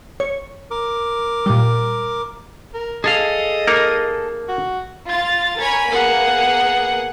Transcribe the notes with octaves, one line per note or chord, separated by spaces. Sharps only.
C#5
A#4 D6
A#2 G3
A#4
G#4 A4 D#5 F5
A#3 D#4 A#4
F#4
F4 A6
A#4 C#5 G#5 B5
A#3 B3 G#4 F#5